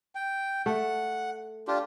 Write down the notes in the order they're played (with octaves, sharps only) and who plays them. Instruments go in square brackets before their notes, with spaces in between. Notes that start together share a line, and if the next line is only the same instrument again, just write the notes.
[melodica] G5
[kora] A3 [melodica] F#5
[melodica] D4 F4 G4